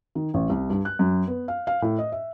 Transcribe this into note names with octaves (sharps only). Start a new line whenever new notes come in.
D#3
A1
C2
G2
F#6
F#2
B3
F5
F5
A2
D#5
E5